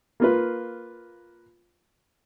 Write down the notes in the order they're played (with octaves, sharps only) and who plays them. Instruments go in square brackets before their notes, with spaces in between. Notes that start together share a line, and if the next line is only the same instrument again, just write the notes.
[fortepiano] A#3 F4 B4